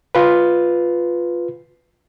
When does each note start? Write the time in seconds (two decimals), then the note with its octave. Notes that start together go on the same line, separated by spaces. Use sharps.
0.15 F4 B4